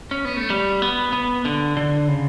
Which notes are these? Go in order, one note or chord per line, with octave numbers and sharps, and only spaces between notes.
C#4
B3
A3
G3
B3
B3
D3
D3
C#3